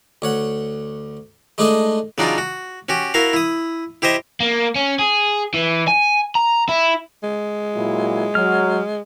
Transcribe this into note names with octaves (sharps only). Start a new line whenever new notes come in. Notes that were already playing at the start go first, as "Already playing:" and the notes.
D2 C#5 F#5
G#3 A3 D4 D#4 G#4 D#5
C#3 F#3 D4 D#4 F4
F#4
C#4 F#4 G4
E4 F#4 A#4 F5
E4 D#6
E4 G4 C5 D#5 E5
A#3
C#4
G#4
E3
G#5
A#5
E4
G#3
A#2 F#3 E4
F#3 F6